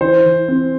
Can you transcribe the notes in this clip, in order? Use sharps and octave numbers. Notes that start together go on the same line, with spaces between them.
E3 C5
E3
C4